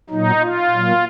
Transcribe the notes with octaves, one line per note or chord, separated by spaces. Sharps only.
A#2 F#3 D#4
F4
A#2 F#3